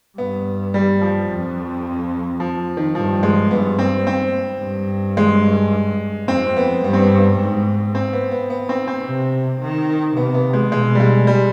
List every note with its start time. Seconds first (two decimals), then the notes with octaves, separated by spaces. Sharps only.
0.18 G2 B3
0.74 G3
1.01 F3
1.29 F2
2.40 F3
2.77 D#3
2.95 G2 F3
3.23 G#3
3.51 G2 B3
3.79 C4
4.07 C4
4.61 G2
5.17 G#3
6.28 F2 C4
6.57 B3
6.83 G2 B3
6.93 C4
7.02 B3
7.39 G#2
7.95 C4
8.13 B3
8.31 B3
8.50 B3
8.69 C4
8.88 C4
9.05 C3
9.61 D#3
10.17 C3 B3
10.34 B3
10.53 G#3
10.72 B2 G#3
10.95 G3
11.00 G#3
11.27 G3